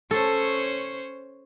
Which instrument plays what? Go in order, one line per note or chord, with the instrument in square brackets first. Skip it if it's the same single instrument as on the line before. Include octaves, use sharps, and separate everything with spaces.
[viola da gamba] C#4 C5 C#5 [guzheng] A4